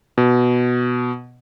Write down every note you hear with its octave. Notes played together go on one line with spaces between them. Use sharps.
B2